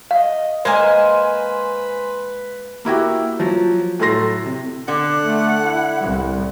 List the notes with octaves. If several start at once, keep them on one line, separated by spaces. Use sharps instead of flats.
D#5 F5
G#3 A#3 B4 C5 G#5
A#3 E4 F#4 G4
F3 F#3
A2 F#3 A4 C6 A#6 C7
C3
D3 F#5
A3
E4
C2